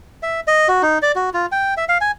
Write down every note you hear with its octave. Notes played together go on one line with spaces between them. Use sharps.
E5
D#5
F#4
D#4
D5
F#4
F4
G5
E5
F5
G#5